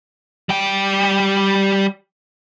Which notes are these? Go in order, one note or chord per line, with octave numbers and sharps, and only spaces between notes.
G3 G5